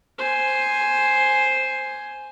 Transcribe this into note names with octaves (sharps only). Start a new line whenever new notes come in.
C5 G#5